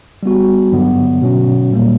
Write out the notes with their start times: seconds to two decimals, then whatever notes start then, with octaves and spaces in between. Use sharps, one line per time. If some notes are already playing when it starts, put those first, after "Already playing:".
0.23 G3 B3 F#4
0.72 G2 D3 F#3 B3
1.22 B2 F#3 C#4
1.71 A#2 G3 A#3